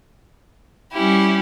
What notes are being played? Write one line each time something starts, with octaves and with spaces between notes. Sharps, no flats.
G3 C#4 E4 G4